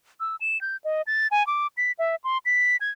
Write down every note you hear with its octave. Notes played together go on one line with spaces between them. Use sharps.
E6
E7
G6
D#5
A6
G#5
D6
B6
E5
C6
B6
G#6